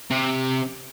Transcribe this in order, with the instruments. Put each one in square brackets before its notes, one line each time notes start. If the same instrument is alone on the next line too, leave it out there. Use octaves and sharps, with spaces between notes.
[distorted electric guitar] C3